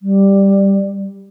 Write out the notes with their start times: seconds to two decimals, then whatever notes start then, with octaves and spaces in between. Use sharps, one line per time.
0.02 G3